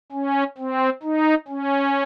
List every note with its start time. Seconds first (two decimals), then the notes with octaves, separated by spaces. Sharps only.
0.12 C#4
0.58 C4
1.03 D#4
1.48 C#4